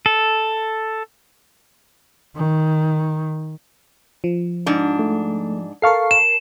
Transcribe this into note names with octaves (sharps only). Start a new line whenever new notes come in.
A4
D#3
F3
G#2 D4
A3
A4 A#4 F5 A5 C#6 C7
E7